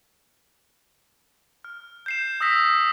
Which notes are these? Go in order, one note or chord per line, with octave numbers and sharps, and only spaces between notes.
F6
G6 C7 E7
D#6 E6 A#6 B6